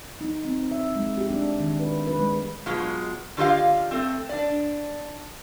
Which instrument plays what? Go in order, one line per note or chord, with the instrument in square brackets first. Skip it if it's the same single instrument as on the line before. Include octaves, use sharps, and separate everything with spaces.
[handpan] D#4
C4
E5
G#3
G4
D4
D#3
B4
B4
G#3
[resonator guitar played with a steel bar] B2 F#3 G#3 F4
D3 F4 G4 D#5 F5
A3 C4
D4 D5